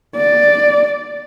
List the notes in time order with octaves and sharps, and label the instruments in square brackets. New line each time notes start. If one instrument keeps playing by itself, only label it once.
[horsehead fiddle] D5